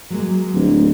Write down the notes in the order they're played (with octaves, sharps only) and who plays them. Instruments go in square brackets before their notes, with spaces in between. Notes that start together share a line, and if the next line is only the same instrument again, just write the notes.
[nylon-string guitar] F#3 G#3 A#3
[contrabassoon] D1